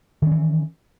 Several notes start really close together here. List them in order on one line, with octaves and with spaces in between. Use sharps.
D#3 C#4 E3